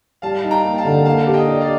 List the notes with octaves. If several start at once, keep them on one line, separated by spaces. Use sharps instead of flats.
G3 F5 A5
D#4
G5 A#5
A#3
F5 A5
D3
A#3 F5 A5
G4
D#5 G5
D4
D5 F5